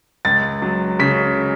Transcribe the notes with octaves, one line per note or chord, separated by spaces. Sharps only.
C#2 A6
F#3
C#3 B6